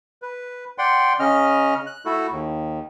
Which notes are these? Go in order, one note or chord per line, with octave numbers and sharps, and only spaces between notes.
B4
D5 F#5 G5 C6
C#3 C#4 D#5 F6
F#6
A3 E4 F#4 A4
D#2